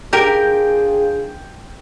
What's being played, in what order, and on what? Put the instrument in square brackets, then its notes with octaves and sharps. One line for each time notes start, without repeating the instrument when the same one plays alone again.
[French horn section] D4 F4 G#4 [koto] G4 A#4 [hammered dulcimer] G5